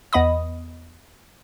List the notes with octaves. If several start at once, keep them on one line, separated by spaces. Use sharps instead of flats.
E2 B3 D#5 B5 D#6